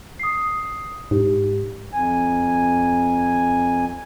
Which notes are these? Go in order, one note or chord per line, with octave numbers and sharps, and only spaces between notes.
D#6 C7
G#2 G4
F2 G#5